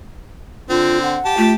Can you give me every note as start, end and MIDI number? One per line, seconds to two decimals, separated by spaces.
0.70 1.18 50
0.70 1.18 60
0.70 0.98 65
1.03 1.35 78
1.25 1.54 67
1.25 1.54 81
1.38 1.55 57
1.38 1.53 65